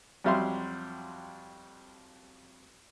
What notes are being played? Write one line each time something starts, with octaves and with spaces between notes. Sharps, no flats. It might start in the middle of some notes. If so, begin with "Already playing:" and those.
F2 F#3 G3 E5 F5 C6